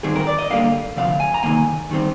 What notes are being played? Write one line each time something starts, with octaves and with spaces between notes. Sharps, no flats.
G#2 D#3 G3 C4 G#4
A#4
D5
D#5
G2 D3 G3 A#3 F5
D2 C3 F3 F5
G#5
A#5
C2 C3 D#3 A#3 G#5
D#3 G3 C4